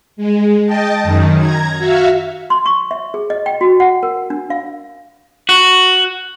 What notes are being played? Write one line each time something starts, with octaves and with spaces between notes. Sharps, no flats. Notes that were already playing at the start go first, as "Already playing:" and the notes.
G#3
D#5 G5 A5
F#2 D#3
A#5 G#6
F#4 E5 F5
C6
C#6
E5
G#4
D#5
G5
F#4
F#5
A#4
D4
F5
F#4